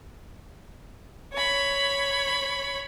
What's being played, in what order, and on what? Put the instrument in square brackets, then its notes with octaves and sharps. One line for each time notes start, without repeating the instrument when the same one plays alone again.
[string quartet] C#5 B5